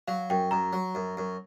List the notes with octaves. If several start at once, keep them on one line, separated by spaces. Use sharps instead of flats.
F#3 F5
F#2 G5
F#2 A#5
F#3
F#2
F#2